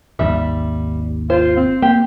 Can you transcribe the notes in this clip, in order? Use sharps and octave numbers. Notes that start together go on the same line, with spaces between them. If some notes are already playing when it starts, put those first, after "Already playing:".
G#1 D#2 G3 E5
F4 C5
C4
A#3 G4